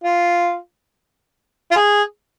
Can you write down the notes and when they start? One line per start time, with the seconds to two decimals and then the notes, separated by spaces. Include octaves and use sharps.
0.04 F4
1.71 F4
1.76 G#4